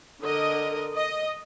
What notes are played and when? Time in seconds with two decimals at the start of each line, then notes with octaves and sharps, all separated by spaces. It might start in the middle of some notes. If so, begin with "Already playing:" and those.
0.21 D3 A#4 D#5
0.95 D#5